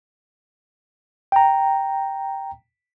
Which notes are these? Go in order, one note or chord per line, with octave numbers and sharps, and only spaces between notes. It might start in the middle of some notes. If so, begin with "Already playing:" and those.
G5 A#5